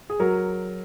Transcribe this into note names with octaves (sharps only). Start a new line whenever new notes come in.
G#4
F#3 A#4